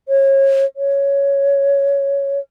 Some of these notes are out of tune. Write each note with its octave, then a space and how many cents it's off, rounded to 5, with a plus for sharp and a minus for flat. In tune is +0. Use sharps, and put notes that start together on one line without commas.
C#5 -30
C#5 +5